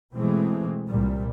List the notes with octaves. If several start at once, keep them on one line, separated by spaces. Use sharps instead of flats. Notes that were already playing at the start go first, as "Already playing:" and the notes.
B2 E3 G#3 A3 C4
C2 A#2 G3